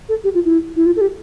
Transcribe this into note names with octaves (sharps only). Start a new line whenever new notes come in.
A4
G4
F4
E4
E4
F4
A4
G4